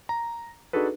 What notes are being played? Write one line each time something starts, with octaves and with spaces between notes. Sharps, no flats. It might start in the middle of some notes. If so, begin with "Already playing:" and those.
A#5
D4 D#4 F#4 G#4 A4 B4